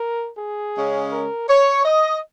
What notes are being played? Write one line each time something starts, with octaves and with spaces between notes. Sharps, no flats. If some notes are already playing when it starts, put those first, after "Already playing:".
Already playing: A#4
G#4
C#3 G#3 C#4
A#4
C#5
D#5